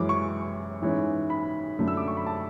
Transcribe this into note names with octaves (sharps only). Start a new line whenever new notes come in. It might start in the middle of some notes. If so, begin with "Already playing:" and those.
Already playing: F#2 E3 G#3 C#4 D6
C#6
G#2 E3 G#3 C#4
B5
F#2 D3 A3 D4
E6
D6
C#6
B5
A5